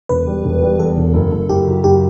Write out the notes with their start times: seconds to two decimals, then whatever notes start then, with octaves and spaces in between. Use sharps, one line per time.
0.09 E1 B4
0.27 G3
0.44 E1
0.62 G3
0.79 E2 A4
0.97 E1
1.14 F#1
1.32 F#1
1.49 F#1 G4
1.67 F#3
1.84 F#1 G4